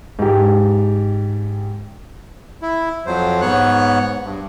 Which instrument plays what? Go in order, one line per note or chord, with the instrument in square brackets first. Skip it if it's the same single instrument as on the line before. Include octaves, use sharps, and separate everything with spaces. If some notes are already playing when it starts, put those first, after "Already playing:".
[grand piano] G#2 G4
[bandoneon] E4
F2 F#3 C5
G#2 B3 C#5 F#6
G2